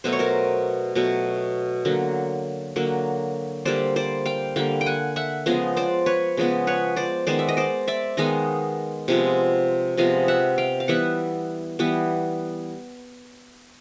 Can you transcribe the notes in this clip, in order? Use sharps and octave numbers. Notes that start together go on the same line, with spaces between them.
B2 F#3 A3 C5
C#5
A#4 C5
B2 F#3 A3
D3 F#3 A#3
D3 F#3 A#3
D3 G3 A#3 C5 D5
C5 D5
F5 G5
D3 G3 A#3 F5 G5
G5
F#5 G#5
E5 F#5
C#3 F3 G#3 B3 D#5 F5
C5 D5
B4 C#5
C#3 F3 G#3 B3
B4 C#5
C5 D5
D#3 G#3 B3 C5 D5
E5
D#5
C5 D5
D5 E5
D#3 G#3 B3 D#5 F5
C3 F3 G#3 B3
C3 F3 G#3 B3 D#5 F5
E5 F#5
F5 G5
F5
E3 G3 B3 E5 F#5
E3 G3 B3